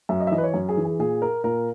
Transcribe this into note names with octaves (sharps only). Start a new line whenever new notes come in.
F#2 E5
D#5
E5
E3 D#5
B4
C#5
F#2
G#4
E3
G#4
A#2 G#4
A#4
A#2 A#4